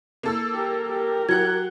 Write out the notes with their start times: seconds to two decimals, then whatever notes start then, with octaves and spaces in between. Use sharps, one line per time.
0.23 A#3 A4 E6
0.53 G4 A#4
0.86 G4 A#4
1.29 F#3 F#5 F#6 G#6